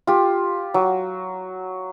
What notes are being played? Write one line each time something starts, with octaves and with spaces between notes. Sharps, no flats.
F4 G4
F#3